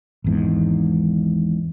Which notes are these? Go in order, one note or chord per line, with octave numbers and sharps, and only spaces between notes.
G#1 E2 G#2